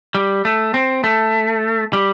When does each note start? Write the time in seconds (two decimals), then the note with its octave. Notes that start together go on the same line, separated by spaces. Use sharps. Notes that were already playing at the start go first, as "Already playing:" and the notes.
0.15 G3
0.45 A3
0.74 C4
1.04 A3
1.93 G3